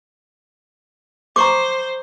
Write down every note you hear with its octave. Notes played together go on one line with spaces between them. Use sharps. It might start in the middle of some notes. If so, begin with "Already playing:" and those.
C5 A#5 C#6 D6